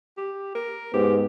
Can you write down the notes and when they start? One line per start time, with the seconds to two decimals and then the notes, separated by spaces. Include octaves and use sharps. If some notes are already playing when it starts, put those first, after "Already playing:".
0.17 G4
0.55 A#4
0.94 G#2 B3 G4